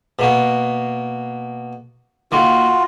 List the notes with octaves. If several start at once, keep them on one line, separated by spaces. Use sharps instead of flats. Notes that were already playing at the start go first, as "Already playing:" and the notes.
B2 A#3 F#4
D#3 A#3 F4 F#4